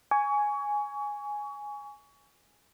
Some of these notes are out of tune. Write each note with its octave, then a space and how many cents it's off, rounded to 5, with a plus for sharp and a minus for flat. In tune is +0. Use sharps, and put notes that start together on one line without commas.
G#5 +0 C#6 +30